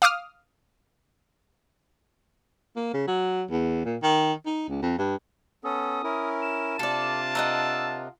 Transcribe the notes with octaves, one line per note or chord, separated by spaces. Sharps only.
F5 D6 D#6 F6
A#3
C#3
F#3
E2
A#2
D#3
D#4
C#2
F2
G2
B3 C#4 A4 D#6
C#4 E4 A#4
E7
C3 D4 F4 A4 D5 A5
A#4 D#5 F#5 E6